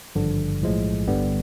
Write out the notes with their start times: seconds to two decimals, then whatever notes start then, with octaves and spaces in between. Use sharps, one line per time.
0.15 G#1 G2 D3 F3
0.62 B1 A2 F3 G#3
1.07 G1 G2 D3 G3 B3